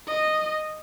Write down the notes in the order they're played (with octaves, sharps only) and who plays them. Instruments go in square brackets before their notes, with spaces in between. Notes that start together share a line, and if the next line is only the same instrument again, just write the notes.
[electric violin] D#5